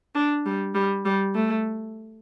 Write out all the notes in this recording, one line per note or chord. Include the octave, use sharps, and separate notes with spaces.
D4
G3
G3
G3
A3